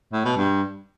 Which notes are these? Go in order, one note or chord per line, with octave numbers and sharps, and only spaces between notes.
A2
B2
G2